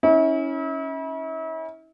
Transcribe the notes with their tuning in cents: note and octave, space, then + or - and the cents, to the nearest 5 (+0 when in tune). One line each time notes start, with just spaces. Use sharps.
C#4 -5 E4 -40